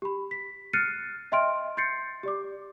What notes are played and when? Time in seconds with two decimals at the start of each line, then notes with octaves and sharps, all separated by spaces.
0.02 G4 B5
0.31 B6
0.73 F6 F#6 A6 C7 C#7 D#7
1.32 D#5 E5 G5 C6 F6 D7
1.77 C6 G6 A6 C7 C#7
2.23 G4 D5 D6